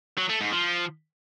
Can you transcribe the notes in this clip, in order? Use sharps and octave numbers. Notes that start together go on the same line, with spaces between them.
F#3
A3
G#2
F3